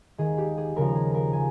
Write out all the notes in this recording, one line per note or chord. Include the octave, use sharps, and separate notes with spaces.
D#2 D#3 G#4
G4
G#4
D#2 C#3 F3 A#4
G#4
A#4
C#3 G#5